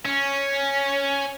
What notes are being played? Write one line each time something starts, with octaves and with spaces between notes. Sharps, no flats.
C#4